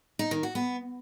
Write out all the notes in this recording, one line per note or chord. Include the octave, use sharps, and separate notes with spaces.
D#4
D#3
F#4
B3